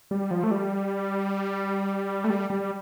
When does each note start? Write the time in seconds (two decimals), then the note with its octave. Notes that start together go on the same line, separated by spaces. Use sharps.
0.11 G3
0.31 F3
0.44 A3
0.51 G3
2.24 A3
2.30 G3
2.50 G3